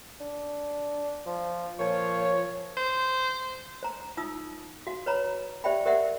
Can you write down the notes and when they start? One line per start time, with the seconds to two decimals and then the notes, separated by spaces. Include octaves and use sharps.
0.20 D4
1.26 F3
1.80 A#2 F3 C#5
2.77 C5
3.83 C5 A#5
4.17 D#4 F4 D#6 E6
4.87 F#4 F5
5.06 B4 C#5 A#5 B5
5.64 G4 C5 D5 E5 G5 B5
5.85 G4 A#4 C5 D5 E5 F#5